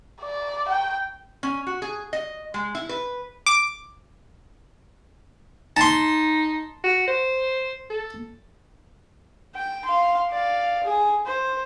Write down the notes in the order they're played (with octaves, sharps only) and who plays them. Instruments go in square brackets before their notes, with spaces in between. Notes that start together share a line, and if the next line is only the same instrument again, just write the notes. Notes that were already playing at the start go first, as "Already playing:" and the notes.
[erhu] D5
G5
[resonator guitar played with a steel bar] C#4
F#4
G#4
D#5
G#3
E4
B4
[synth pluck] D6
[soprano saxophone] D#4 [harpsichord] A5 C6
[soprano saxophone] F#4
C5
A4
[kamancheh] G5
F5 C6
D5 F5
G#4
C5